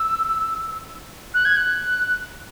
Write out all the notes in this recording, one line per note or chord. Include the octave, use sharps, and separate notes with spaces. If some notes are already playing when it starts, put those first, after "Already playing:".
Already playing: E6
F#6
G#6
F#6